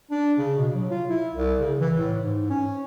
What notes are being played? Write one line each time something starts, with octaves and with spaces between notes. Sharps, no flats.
D4
C#3
B2
F#3
F4
E4
C2
C#3
E3
A2
G#2
C#4